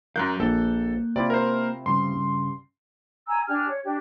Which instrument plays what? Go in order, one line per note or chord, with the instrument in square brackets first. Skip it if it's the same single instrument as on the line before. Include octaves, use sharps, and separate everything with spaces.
[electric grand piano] F#2 F#6 G6 [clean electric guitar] F#3 F5 [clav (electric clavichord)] A#4
[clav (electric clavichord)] A#1 [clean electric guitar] A#3 [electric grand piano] A4
[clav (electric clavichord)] C3 E4 F4 [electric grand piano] D5
[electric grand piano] A#4 C5
[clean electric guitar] G2 C#3 G3 [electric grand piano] C6
[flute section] G#5 A#5 E6
D4 G4 G#5 F6
C#5
D4 G4